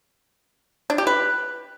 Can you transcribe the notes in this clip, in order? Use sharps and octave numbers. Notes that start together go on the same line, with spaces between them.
D4
G4
B4